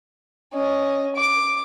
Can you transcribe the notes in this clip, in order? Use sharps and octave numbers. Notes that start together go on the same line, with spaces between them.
C#4 D#5
D6